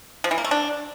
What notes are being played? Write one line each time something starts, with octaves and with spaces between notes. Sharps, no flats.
F3
E3
A#3
A3
D4